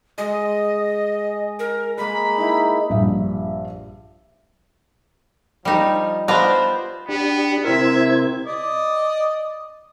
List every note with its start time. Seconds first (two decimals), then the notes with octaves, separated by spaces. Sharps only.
0.18 G#3 D#5
1.59 A#4
1.98 G#3 A#3 B5
2.38 D#4 E4
2.90 A#1 G2 E5
5.65 F3 G3 D#4
6.28 B3 D4 F4 C5 A#5
7.09 B3 D4 G4
7.64 C3 C4 E4 A#4 C5 E5 G#6
8.46 D5 D#5